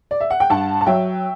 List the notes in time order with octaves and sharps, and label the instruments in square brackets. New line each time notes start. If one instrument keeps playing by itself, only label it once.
[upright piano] D5
E5
F#5
G5
G2 F#5 A5
A5
F#3 E5 G5